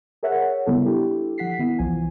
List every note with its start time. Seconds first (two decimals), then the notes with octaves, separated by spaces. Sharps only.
0.23 G#4 A#4 C#5 E5 F#5
0.66 C#3 G3 B3 E4 A4
0.86 D4 E4 G4 A4
1.38 F3 F#5 B6 C7
1.59 D#3 B3 E4
1.79 C2 E3 F3 G#5